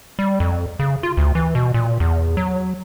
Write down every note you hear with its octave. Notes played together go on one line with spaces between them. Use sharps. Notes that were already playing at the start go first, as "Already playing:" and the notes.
G3
F2
C#3
F4
D2
E3
B2
A#2
E2
F#3